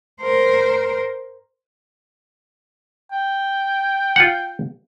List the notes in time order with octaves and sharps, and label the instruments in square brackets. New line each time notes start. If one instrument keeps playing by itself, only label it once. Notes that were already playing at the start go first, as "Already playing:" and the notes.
[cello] A#4 C5
[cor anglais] G5
[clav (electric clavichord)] F4 F#5